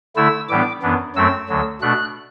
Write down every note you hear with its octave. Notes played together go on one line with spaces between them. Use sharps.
D3 A3 E4 E6
A2 E3 G3 B3 D4 D6
F#2 E3 B3 D4
F#2 F#3 A3 C4 E6
D2 D3 F#3
B2 A3 D4 F#6